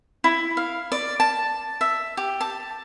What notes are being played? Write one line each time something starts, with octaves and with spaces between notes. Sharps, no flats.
E4
F5
D5
A5
E5
G4
A5